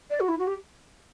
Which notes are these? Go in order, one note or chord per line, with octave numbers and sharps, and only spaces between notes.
D5
F#4
E4
F#4
G4